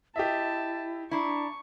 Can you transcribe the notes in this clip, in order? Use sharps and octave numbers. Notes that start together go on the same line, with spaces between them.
E4 G4 D#5 E5 A5
D4 E4 A#5 C#6